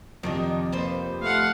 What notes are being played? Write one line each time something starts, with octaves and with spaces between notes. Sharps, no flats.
F2 C3 D#3 D4 D#4
G3 A#3 B4 C5
A3 F5 F#5